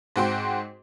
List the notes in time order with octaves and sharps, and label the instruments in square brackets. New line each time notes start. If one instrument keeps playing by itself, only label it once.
[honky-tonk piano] G#2 C4 F#4 G5 C6